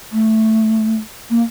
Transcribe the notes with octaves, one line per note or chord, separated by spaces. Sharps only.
A3
A#3